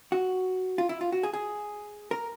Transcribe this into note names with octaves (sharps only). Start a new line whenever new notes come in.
F#4
F4
E4
F4
F#4
G#4
G#4
A#4